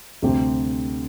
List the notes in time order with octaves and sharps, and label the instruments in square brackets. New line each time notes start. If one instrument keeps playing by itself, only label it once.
[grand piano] D2 C3 G3 C4 G4